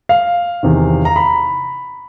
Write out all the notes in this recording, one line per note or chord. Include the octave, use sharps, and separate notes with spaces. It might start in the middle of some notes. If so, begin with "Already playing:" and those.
F5
E2 C3 D#3
A#5
B5